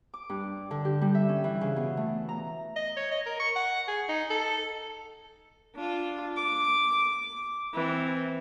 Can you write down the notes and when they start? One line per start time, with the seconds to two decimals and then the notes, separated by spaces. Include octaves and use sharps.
0.14 D6
0.29 G2
0.71 D3
0.85 G4
1.01 G3
1.15 E5
1.29 C#4
1.44 E3
1.61 C#3
1.76 B2
1.97 A3
2.29 A#5
2.76 D#5
2.97 C#5
3.11 D#5
3.26 A#4
3.40 C#6
3.56 F#5
3.88 G#4
4.09 D#4
4.30 A4
5.75 D4 F4
6.36 D6
7.74 E3 C4